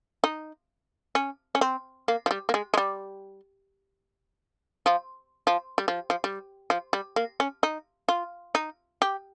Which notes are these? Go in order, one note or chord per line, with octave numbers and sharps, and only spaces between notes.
D#4
C#4
C#4
C4
A#3
F3
G3
A#3
G#3
G#3
G3
F3
F3
G3
F3
F3
G3
F3
G3
A#3
C#4
D#4
F4
D#4
G4